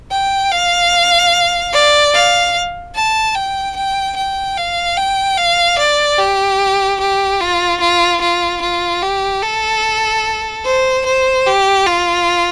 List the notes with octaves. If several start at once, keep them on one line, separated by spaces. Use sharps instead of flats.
G5
F5
D5
F5
A5
G5
G5
G5
F5
G5
F5
D5
G4
G4
F4
F4
F4
F4
G4
A4
C5
C5
G4
F4